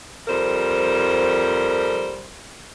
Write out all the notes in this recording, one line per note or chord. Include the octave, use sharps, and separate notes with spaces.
F2 G3 A#4 C5